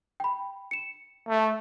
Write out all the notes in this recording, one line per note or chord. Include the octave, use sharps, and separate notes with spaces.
G5 B5
C#7 E7
A3